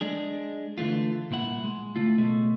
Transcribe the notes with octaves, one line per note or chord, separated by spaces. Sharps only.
G#3 D4 G#4
D3 E3 A3 F4
C2 A#2 E4 F#5
G#3
C#3 A3 E4 F4
B2 G#3 A3